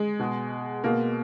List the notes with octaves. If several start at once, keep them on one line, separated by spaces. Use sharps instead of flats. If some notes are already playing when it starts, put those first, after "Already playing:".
Already playing: G#3
B2
B2 A#3